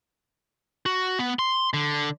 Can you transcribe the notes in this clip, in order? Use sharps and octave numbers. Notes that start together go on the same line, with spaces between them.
F#4
B3
C6
D3